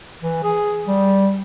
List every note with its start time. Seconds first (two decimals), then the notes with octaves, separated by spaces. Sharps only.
0.23 E3
0.44 G#4
0.87 G3